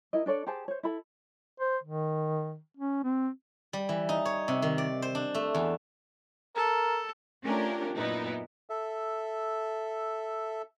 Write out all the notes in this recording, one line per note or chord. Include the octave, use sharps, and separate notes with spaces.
E4 A#4 D#5
D4 A4 C#5 D5
G4 G#4 C5 A5
C5 C#5
E4 A4 B5
C5
D#3
C#4
C4
G3
E3
D#4
C#5
C3
D#3
D5
C5
D4
A3
E2
A4 A#4
A3 C#4 D4 F4 G4 A#4
F#2 A#2 B3 D#4 E4
A4 E5